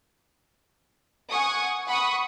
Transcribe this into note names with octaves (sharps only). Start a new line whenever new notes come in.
F#5 G#5 C#6 D#6
F#5 B5 C#6 D#6